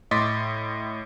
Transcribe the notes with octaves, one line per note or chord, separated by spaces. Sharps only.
A2 D#5 C6 D6 A6 B6